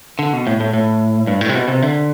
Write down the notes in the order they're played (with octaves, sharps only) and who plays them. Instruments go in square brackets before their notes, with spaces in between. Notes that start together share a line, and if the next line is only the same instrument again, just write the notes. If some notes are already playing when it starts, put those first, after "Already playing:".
[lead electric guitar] D3
B2
A2
A2
A2
G2
A2
C3
B2
C3
D3